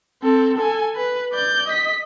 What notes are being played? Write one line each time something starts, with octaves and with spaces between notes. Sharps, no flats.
C4 A4
A4 G#5
B4
D5 G6
D#5 B6